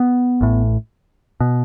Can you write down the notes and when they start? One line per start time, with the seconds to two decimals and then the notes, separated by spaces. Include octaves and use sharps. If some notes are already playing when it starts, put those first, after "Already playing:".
Already playing: B3
0.41 A1 A2
1.40 B2